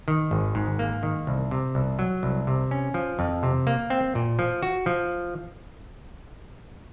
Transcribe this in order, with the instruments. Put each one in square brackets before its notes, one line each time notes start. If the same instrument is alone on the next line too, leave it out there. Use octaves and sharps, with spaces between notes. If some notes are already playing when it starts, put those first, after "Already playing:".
[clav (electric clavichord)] D#3
G#1
G#2
A#3
D#3
C2
C3
C2
F#3
C2
C3
C#4
F3
F2
C3
A#3
C4
A#2
F3
F#4
F3